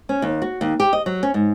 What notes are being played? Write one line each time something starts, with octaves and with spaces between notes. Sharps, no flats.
C#4
D#2
F#4
D#2
G4
D#5
F#3
C#4
G#2